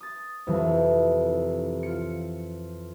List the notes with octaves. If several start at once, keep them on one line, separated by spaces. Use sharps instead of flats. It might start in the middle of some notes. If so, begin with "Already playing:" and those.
D#6 A6
C2 F2 E3
F4 C#7